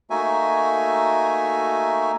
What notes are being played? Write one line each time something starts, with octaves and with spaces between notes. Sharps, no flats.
A3 A#3 D#4 F#4 E5 G#5